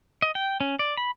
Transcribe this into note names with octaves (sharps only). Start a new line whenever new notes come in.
D#5
G5
C#4
D5
B5